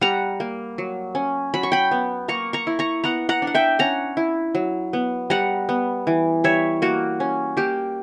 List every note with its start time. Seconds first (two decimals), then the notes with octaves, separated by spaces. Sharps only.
0.01 G3 F#5 A#5
0.40 A#3
0.78 F#3
1.15 C#4
1.54 F#3 B5
1.63 C#6
1.72 G5 B5
1.91 B3
2.28 A#3 A#5 C#6
2.53 A#5 C#6
2.67 E4
2.79 A#5 C#6
3.04 B3 F#5 A#5
3.29 F#5 A#5
3.42 D4
3.47 F#5
3.55 E5 G5
3.79 C#4 F#5 A#5
4.17 E4
4.55 F#3
4.93 B3
5.30 G3 F#5 A#5
5.69 B3
6.07 E3
6.44 G3 C#5 E5
6.82 A#3 F#4
7.20 C#4
7.57 A#3 G4